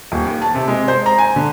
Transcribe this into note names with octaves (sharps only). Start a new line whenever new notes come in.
D#1
D#2
A5
C3
G#3
C5
A#5
G#5
D3